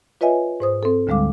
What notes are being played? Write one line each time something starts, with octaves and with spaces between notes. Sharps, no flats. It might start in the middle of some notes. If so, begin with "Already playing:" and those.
F4 B4 C#5 D#5 E5 G#5
G#2 C5 D#6
C4 A4
D2 D3 G3 G#3 F5 D6